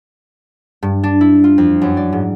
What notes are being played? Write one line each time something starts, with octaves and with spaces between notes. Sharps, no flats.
G2
D4
E4
F4
F2
F#2
D5
G#2